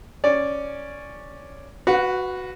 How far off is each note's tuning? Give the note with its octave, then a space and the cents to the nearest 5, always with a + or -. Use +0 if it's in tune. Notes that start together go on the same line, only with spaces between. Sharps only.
C#4 +0 D5 +0
F#4 +0 B4 +5 F#5 -45